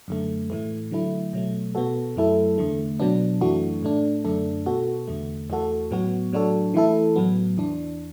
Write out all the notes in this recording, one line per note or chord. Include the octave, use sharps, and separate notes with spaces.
F#2 D3 A3
A2 E3 A3
D3 F#3 A3 E4
B2 F#3 A3
B2 B3 F#4 A4
F#2 F#3 A3 E4 A4
E2 D3 A3
B2 F#3 B3 D4
F#2 E3 A3 D4 F#4
A2 A3 D4
F#2 D3 A3 D4 A4
B2 B3 F#4 A4
E2 D3 A3
E2 E3 A3 F#4 A4
A2 F#3 B3 F#4
A2 F#3 D4 F#4 A4
E3 A3 E4 A4
A2 F#3 B3
E2 E3 D4